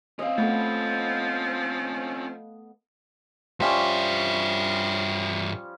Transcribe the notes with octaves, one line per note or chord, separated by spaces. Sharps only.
C4 C#4 D#5 F5
F3 A3 B3 A4
G2 F3 G3 C#4 E5